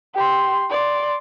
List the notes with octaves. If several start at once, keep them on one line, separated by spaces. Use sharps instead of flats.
G4 C6
D5 C6